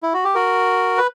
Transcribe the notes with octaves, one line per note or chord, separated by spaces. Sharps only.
E4
F#4
G4
F#4 A#4
B4